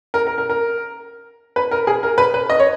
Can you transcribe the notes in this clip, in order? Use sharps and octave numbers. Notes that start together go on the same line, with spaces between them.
A#4
A#4
A#4
A#4
B4
A#4
G#4
A#4
B4
B4
D#5
C#5